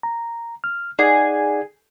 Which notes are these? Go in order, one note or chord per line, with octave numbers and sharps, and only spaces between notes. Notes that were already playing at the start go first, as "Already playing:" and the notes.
A#5
F6
D#4 G#4 D5 F#5